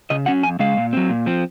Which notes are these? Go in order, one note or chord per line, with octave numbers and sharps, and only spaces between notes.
C#3 D#5
F#3 C#4 F#5
F2 G#5
C#3 G#3 F5
A#2
F#3 C4
A#2
F3 C4